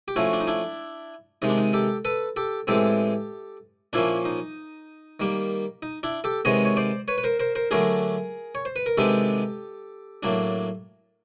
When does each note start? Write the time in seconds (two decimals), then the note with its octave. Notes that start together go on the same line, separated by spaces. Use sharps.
0.08 G4
0.16 F3 A3 C#4 E4 F#4
0.33 D4
0.41 D#4
0.47 D4 E4
1.42 C3 D#3 G#3 D#4
1.49 D4
1.58 D#4
1.73 G4 A4
2.05 A4 B4
2.36 G4 A4
2.67 A2 E3 G#3 C4 G4 A4
3.93 A#2 F3 A#3 C#4 D4 E4
4.25 D#4
5.20 D#3 G3 A#3
5.83 D#4
6.03 D4 E4
6.24 G4 A4
6.45 C3 D#3 G#3 B3 C#5 D#5
6.65 C#5
6.77 C5 D5
7.08 B4 C#5
7.18 B4
7.24 A#4 C5
7.40 A#4 C5
7.55 A#4 C5
7.71 D3 F#3 A3 D4 G#4 A#4
8.55 C#5
8.65 C5
8.76 B4
8.86 A#4
8.98 C3 D#3 G#3 B3 D4 G4 A4
10.23 A2 F#3 A#3 D4